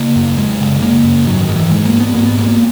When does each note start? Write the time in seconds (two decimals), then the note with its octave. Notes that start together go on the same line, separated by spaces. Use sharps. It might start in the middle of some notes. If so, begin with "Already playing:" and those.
Already playing: C#3 A#3
0.16 F#2
0.38 F#2 G#3
0.61 C#3
0.82 C#3 A#3
1.04 F#2
1.26 G#2 F#3
1.41 D#3
1.49 G#2
1.56 E3
1.71 G#2 G#3
1.85 A#3
1.93 G#2
2.00 B3
2.15 G#2 A#3
2.26 B3
2.38 G#2 A#3
2.48 A#3